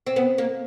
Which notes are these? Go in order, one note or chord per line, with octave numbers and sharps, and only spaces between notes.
C4
B3
A#3